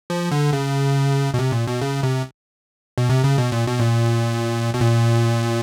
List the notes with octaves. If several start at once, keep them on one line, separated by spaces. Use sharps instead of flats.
F3
D3
C#3
B2
C3
A#2
B2
C#3
C3
B2
C3
C#3
B2
A#2
B2
A#2
B2
A#2